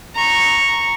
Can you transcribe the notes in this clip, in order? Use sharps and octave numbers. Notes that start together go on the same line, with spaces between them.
A#5 C#6